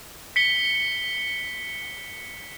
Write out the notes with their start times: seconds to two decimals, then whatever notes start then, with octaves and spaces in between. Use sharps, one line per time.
0.36 B6 C#7 G7